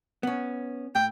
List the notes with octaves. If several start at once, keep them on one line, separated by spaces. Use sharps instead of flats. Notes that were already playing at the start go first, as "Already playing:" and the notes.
B3 C#4
A2 G5